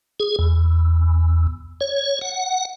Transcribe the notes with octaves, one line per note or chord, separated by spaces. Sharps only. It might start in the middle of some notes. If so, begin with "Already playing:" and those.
G#4
E2
C#5
F#5